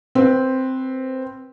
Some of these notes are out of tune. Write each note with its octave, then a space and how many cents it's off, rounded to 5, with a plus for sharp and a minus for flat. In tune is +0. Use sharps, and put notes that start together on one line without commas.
C4 +0 B4 -10